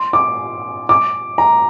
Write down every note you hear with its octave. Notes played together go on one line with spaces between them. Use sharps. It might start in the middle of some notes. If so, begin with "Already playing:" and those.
Already playing: C6
D6
D6
A#5